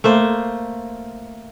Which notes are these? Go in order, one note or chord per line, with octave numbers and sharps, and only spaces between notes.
A3 A#3 C5